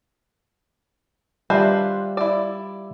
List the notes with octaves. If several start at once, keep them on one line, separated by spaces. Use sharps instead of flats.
G3 D4 F4 B4 C5 D#5 E5
E4 D5